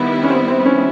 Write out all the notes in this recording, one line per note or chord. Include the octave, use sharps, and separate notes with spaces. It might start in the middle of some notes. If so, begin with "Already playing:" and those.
Already playing: D#3 G3 B3 E4
C#4
C4
C4
C#4